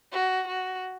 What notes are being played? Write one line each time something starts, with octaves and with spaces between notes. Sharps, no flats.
F#4
F#4